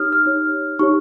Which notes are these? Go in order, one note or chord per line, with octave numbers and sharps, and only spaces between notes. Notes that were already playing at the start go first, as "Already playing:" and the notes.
Already playing: D#4 G4 C#5 D#6 F6
F6
D#4 G4 C#5
D#4 G4 C#5 C#6